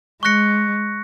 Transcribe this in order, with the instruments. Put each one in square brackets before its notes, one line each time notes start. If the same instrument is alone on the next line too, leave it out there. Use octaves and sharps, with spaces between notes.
[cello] G#3 [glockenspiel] C#6 F#6 A#6 C#7